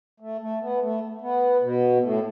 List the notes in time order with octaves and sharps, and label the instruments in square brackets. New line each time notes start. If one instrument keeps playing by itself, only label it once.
[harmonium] A3
A3
B3
A3
B3
B2
A2